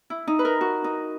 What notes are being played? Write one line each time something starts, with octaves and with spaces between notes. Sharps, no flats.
E4
D#4
B4
A#4
F#4
D#4